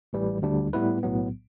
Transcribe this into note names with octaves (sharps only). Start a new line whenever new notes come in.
A1 A2 E3 G3
D2 D3 G3 D4
A2 G3 B3 E4 B4
B1 A2 F#3 B3